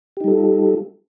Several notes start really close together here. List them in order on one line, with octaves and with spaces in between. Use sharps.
G4 D#4 G3 A4 F4